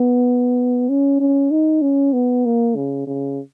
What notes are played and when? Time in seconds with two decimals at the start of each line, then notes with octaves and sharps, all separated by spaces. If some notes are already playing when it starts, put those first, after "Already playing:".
Already playing: B3
0.89 C#4
1.21 C#4
1.51 D#4
1.82 C#4
2.13 B3
2.46 A#3
2.76 C#3
3.07 C#3